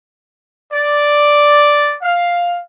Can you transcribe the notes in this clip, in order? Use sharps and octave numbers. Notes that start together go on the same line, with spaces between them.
D5
F5